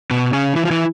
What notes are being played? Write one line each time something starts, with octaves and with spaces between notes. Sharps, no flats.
B2 B3
C#3 C#4
E3 E4
F4
E3 E4